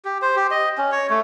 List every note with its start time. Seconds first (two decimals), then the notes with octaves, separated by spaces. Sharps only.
0.05 G4
0.22 C5
0.36 G4
0.51 D#5
0.78 C#4
0.92 C#5
1.10 A3